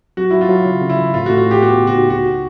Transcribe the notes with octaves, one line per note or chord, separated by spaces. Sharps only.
F#3 F#4
F#3 E4
F4
F#3
C#3
C#3
E4
E3
A2 F4
F#4
A2
F#4
A2
G4
B3 F#4
C#3
F#4
D#4
C#2 F#4